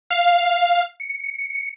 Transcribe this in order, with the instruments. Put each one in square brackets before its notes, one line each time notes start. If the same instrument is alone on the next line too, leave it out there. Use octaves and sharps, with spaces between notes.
[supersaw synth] F5
C#7